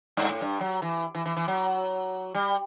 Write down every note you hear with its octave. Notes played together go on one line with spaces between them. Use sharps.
G2
A2
G2
F#3
E3
E3
E3
E3
F#3
G3